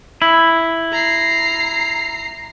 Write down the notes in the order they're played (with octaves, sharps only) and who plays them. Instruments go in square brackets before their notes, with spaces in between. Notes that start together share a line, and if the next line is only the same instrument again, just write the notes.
[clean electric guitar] E4
[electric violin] A#5 C7